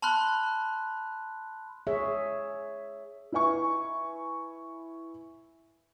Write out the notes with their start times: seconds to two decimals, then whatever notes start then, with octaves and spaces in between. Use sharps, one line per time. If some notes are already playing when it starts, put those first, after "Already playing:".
0.02 A5 B5 C6 F6 F#6
1.87 G#4 C#5 E5
3.32 E4 B4 E5 G#5 C#6